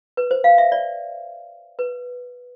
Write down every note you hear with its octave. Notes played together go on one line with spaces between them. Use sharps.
B4
C5
F5
E5
D5
B4